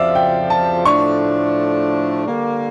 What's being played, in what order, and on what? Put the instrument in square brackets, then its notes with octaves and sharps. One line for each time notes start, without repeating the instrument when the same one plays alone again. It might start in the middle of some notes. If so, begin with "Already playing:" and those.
Already playing: [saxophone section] F2 C#3 F3 [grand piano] D5 E5 F5
[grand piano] G5
A5
[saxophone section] A2 F3 A3 D4 [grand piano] C#6
[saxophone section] D3 G3 A#3